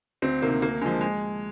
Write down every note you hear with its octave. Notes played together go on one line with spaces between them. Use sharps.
D2 C4
C3 D#3 A#3
D2 A#3
D3 F3 G#3
G#3